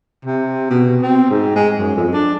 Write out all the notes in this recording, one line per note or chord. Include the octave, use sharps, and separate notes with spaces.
C3
B2
C4
G#2
G#3
F#2
F2
D4